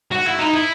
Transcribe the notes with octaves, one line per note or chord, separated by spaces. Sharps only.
F#4
E4
D#4
E4